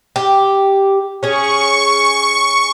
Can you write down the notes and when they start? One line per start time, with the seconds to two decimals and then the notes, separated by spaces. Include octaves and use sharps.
0.16 G4
1.23 C#4 G#4 C#6